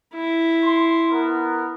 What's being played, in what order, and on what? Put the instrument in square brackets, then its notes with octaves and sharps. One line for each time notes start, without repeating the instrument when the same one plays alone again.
[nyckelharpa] E4
[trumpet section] C6
B3 A#4